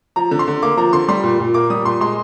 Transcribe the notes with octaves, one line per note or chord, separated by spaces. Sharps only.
F3 A#5
D3
C6
D3
A#3 D6
F3 A#5
D3 C6
G3 C6
A#2
A#2
A#3 D6
G3 D#6
A#2 C6
G#3 C6